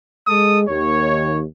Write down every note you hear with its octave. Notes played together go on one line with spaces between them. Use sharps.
G#3 A4 D#6
D#2 C#5